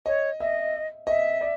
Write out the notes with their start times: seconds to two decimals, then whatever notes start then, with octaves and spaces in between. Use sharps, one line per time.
0.06 C#5 D#5
0.40 D#5 E5
1.07 D#5 E5
1.41 D5